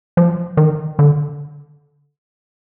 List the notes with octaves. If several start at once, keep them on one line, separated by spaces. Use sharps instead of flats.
F3
D#3
D3